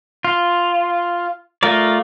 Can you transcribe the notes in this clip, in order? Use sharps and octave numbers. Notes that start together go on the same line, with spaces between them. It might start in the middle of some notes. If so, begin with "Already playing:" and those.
F4
A3 F4 A#4 D5